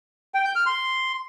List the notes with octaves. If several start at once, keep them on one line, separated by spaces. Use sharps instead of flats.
G5
G6
F6
C6